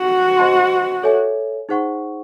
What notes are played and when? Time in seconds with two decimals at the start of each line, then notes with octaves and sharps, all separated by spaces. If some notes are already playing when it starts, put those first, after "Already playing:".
Already playing: F#4
0.37 C5 D#5 A5 C6
1.03 A4 C#5 E5 G#5
1.69 D#4 G#4 C5 F#5 C#6